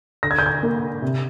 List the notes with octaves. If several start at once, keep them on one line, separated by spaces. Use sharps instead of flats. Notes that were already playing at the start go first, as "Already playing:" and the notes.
D3 A#6
G#6
G6
G#6
A#3
C3